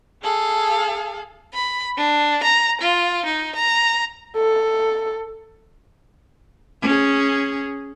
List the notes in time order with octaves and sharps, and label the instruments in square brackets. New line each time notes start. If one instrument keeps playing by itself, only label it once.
[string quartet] G#4 A4 F5
[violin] B5
D4
A#5
F4
D#4
A#5
[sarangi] A4
[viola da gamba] C#4 G#4